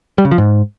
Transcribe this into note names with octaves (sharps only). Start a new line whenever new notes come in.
G3
C#3
F3
G#2